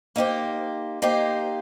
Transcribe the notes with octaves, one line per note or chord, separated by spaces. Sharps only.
A#3 D#4 G4 C5
A#3 D#4 G4 C5